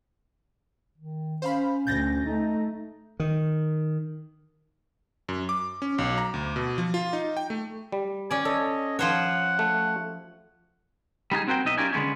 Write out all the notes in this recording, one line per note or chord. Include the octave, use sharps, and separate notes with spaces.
D#3
C#4 C5 F5 B5
D2 G6 A6 A#6
A3 D#4
D#3
F#2
D6
C#4
B1
A#5
D2
B2
F3
F4
D#4
G5
A3
G3
C#4 D5 G#5
A4 C#5 D#5
F3 C5 C#5 F#5
A3
G3 D#4 F4 G#4
C4 F#4 A#4 C5 G5
B1 B2 D#4 D#5 E5
C#4 F4 G4 A#4 D5 G#5
D3 G#3 A#3 B3 C#4